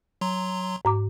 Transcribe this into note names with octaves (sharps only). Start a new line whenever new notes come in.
F#3 A#5 C6
G#2 A#5 D6